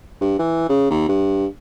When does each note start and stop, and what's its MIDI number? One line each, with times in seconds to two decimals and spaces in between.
0.21 0.39 43
0.39 0.65 52
0.69 0.90 49
0.90 1.06 39
1.09 1.46 43